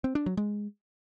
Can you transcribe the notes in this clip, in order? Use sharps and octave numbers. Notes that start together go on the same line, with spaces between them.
C4
D4
F#3
G#3